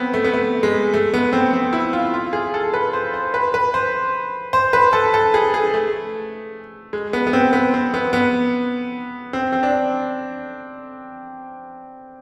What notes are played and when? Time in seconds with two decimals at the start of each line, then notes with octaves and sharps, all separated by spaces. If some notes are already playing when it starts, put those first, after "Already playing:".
Already playing: B3 C4
0.14 A3
0.24 B3
0.33 A3
0.63 G#3
0.94 A3
1.14 B3
1.33 C4
1.53 C4
1.73 E4
1.93 F4
2.14 F4
2.33 G#4
2.54 A4
2.74 B4
2.93 C5
3.14 C5
3.34 B4
3.54 B4
3.74 C5
4.53 C5
4.73 B4
4.93 A4
5.14 A4
5.34 G#4
5.54 G#4
5.74 A3
6.93 G#3
7.13 B3
7.27 B3
7.33 C4
7.53 B3
7.74 C4
7.94 B3
8.13 B3
9.33 C4
9.52 C4
9.63 D4